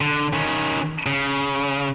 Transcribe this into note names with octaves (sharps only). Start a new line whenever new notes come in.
D3
D#3 C#4
C#3